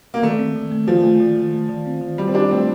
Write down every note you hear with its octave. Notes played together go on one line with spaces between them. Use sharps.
A#3
D#3 A3
C4
D#3
A3
D#3 F3
A3
D#3
D#3
A3
D#3
C4
D#3
D#3 G3
C4
D4 G4
A3 C4